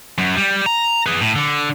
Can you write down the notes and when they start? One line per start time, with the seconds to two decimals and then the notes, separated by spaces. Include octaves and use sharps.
0.18 F#2
0.36 G3
0.66 A#5
1.06 G#4 B4
1.21 A2
1.36 D3